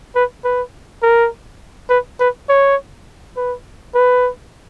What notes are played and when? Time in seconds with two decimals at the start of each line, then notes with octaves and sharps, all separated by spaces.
0.15 B4
0.44 B4
1.02 A#4
1.90 B4
2.20 B4
2.49 C#5
3.36 B4
3.95 B4